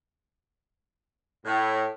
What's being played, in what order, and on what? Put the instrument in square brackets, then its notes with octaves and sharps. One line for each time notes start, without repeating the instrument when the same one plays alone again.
[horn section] A2